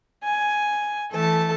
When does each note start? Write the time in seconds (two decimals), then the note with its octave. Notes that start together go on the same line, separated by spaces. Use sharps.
0.24 G#5
1.12 E3 A3 A4 A5